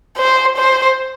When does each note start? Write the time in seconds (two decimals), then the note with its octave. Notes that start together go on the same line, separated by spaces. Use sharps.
0.18 C5
0.58 C5